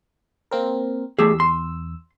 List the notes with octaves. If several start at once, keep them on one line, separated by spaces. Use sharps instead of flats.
A#3 C4 A#4
E2 A3 G4 G#4 E6
C6